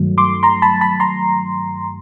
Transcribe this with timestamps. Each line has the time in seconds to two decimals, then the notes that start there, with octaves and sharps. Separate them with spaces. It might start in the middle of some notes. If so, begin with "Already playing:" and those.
Already playing: G2 D#3 F#3 A3
0.18 C6 D6
0.43 A#5 C6
0.62 A5 B5
0.81 A5 B5
1.00 A#5 C6